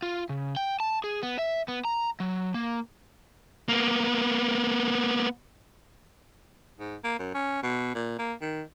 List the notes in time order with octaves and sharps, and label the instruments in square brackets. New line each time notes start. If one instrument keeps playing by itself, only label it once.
[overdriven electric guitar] F4
C#3
G5
A5
G#4
B3
E5
B3
A#5
F#3
A#3
[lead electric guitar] A#3 B3
[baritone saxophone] G#2
A#3
F#2
C#4
B2
A#2
A#3
D#3